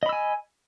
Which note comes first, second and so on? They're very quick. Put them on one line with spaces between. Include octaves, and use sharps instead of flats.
D#5 B5 E6 G#5